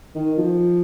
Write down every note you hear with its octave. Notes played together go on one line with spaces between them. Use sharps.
D#3
F3